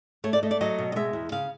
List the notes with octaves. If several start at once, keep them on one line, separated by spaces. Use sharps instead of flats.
A3 C#5
D5
A3 D#5
D5
F#3 D#5
B2
D#5
G#3 E5
E2
C#3 F5